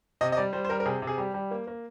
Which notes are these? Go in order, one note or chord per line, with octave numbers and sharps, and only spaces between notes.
C3 D#5
D#5
G3 D5
G3 C5
C5
G3 A#4
A#4
C3 G#4
C3
G#4
G3 G4
G3
A#3
A#3